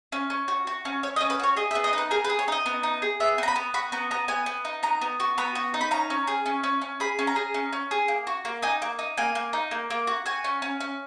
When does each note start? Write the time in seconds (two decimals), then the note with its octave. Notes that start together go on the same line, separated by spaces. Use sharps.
0.12 C#4
0.30 C#4
0.48 F#4
0.67 F#4
0.85 C#4
1.03 C#4 C#5
1.16 D#5
1.21 C#4
1.30 B4
1.39 F#4 C#5
1.56 G#4 D#5
1.71 E5
1.75 B3
1.84 D#5
1.93 D#4 B4
2.11 G#4 A#4
2.24 B4
2.29 G#4
2.39 C#5
2.48 D#4 D#5
2.66 B3
2.83 D#4
3.02 G#4
3.20 B3 E5
3.38 B3 A#5
3.48 B5
3.56 B3
3.74 F#4 B5
3.92 B3 A#5
4.11 B3 A#5
4.28 B3 G#5
4.46 B3
4.65 D#4
4.83 B3 A#5
5.01 B3
5.20 F#4
5.38 B3 B5
5.55 F#4
5.74 D#4
5.81 B5
5.91 C#4 A#5
6.10 C#4
6.27 G#4
6.46 C#4
6.63 C#4
6.81 C#4
7.00 G#4 B5
7.19 C#4
7.27 A#5
7.36 G#4
7.54 C#4
7.72 C#4
7.91 G#4
8.08 A#3
8.27 F#4
8.45 A#3
8.62 D#4 G#5
8.82 A#3
8.99 D#4
9.17 A#3 G#5
9.35 A#3
9.53 D#4
9.71 A#3
9.90 A#3
10.07 F#4
10.26 F#4 G#5
10.44 C#4
10.62 C#4
10.80 C#4